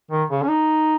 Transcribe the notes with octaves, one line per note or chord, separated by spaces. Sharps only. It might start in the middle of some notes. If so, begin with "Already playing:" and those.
D#3
C#3
C#4
D#4